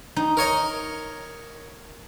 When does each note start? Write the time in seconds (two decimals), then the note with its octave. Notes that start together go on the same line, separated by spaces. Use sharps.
0.16 D#4
0.37 A#4 C#5 D#5